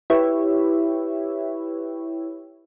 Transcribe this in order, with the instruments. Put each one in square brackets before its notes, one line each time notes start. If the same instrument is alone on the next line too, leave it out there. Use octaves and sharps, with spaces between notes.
[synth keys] E4 G4 B4 C#5 E5